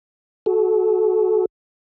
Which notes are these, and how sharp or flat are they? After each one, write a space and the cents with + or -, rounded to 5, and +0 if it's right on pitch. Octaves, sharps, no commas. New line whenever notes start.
F#4 +0 A4 -30